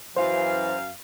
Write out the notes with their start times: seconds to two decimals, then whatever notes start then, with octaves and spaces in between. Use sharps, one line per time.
0.17 F#2 E3 C5 F5